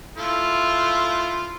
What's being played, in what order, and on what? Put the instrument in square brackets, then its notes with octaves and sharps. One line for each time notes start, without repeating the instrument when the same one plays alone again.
[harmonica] A3 E4 F4